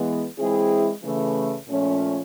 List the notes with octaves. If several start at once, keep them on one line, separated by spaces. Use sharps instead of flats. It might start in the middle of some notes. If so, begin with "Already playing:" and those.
Already playing: E3 G#3 B3
E3 G#3 C4 E4 G#4
C#3 E3 A3
A#2 F3 A3 C#4